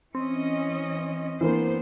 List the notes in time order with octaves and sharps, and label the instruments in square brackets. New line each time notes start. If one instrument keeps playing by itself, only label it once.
[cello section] E3 C#4 D#5 [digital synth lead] C4
[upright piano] E3 A#3 [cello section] B3 D4 C5